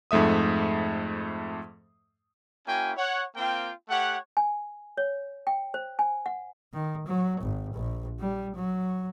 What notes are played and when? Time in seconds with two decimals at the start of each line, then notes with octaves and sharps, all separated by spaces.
0.11 F2 G#2 A3 E5 D#6
2.67 A#3 C#4 E4 F#4 G5 G#5
2.97 C#5 F#5
3.36 A#3 C4 F4 G5
3.89 A3 G4 C#5 F#5
4.37 G#5
4.97 C#5
5.47 G5
5.74 C5
5.99 G#5
6.26 F#5
6.73 D#3
7.07 F#3
7.41 G#1
7.74 A#1
8.19 G3
8.55 F#3